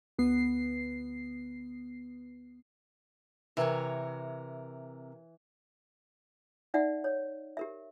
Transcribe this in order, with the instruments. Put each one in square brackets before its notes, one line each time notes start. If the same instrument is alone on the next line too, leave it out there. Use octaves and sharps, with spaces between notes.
[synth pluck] D2 B3 C7
[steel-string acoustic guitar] C3 A#4 [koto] E3 C#5
[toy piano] D#4 D5 E5 F#5
C#5
G4 A#4 E5